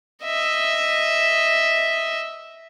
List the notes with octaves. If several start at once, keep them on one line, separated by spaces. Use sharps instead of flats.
D#5 E5